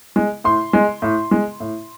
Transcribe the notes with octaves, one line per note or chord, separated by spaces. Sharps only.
G#3
A2 C6
G#3
A2
G#3
A2